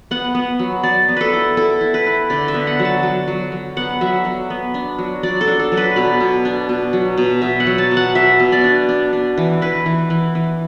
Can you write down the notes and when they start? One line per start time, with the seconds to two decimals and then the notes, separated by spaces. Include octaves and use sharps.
0.11 B3 F#5
0.35 B3
0.59 F#3
0.83 F#3 D5
1.08 B3
1.16 A4 B4
1.33 E4
1.57 E4 A4
1.81 E4
1.94 B4
2.06 E4
2.30 D3 D5
2.48 E5
2.54 B3
2.67 F#5
2.79 F#3
2.85 A5
3.03 F#3
3.28 F#3
3.52 F#3
3.77 B3 F#5
4.01 F#3 E5
4.25 F#3
4.50 B3
4.74 D4
4.98 F#3
5.23 F#3 D5
5.41 A4
5.47 D4
5.60 A4
5.72 F#3
5.77 B4
5.96 B2 D5
6.20 B2
6.45 D4
6.69 B2
6.93 F#3
7.17 B2
7.42 B2 E5
7.60 F#5
7.67 F#3
7.78 A5
7.91 B2
7.97 F#5
8.15 B2 E5
8.40 B2
8.52 D5
8.64 D4
8.89 D4
9.13 D4
9.38 E3
9.62 E3 B4
9.86 E3
10.10 E3
10.35 E3